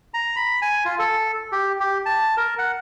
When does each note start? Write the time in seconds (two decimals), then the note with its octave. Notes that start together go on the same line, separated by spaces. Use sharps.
0.14 A#5
0.36 B5
0.62 G#5
0.85 F4
0.99 A4
1.52 G4
1.80 G4
2.06 A5
2.37 A#4
2.59 F#5